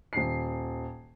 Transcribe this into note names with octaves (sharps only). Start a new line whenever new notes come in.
D#1 C7